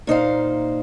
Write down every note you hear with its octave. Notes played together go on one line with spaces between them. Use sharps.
A#2 D#4 C5 F5